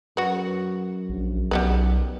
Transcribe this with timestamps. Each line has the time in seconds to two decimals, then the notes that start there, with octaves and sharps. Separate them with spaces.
0.17 F#2 F#4 B4
1.09 A#1
1.51 B1 G3 B3 B4